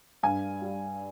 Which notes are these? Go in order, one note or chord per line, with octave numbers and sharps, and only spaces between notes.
G2 F5 G#5
G3